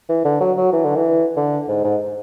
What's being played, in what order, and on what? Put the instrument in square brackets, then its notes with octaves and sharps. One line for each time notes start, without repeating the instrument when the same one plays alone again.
[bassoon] E3
D3
F#3
F#3
E3
D3
E3
D3
G#2
G#2